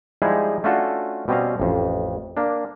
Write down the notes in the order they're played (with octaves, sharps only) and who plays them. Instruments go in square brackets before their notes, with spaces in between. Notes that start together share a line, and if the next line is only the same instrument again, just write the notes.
[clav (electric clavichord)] F3 G3 G#3 D#4 E4 G#4
A3 C#4 D4 F4 F#4 A4
B2 G3 C4 C#4 D#5 F5
A1 F2
A#3 D4